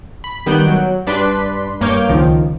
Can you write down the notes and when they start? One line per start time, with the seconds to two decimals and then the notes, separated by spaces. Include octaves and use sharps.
0.24 B5
0.46 D#3 G3 B3 F#6 G6 D7
0.68 F#3
1.07 G2 D4 B4 D5 C6 B6
1.81 G2 A#3 C#5 D6 F6 G6
2.09 C#2 D#3 F3